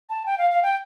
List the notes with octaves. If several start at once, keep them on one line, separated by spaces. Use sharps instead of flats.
A5
G5
F5
F5
G5